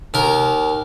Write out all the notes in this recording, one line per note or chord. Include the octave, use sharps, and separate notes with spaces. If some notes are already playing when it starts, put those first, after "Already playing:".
D#2 A#4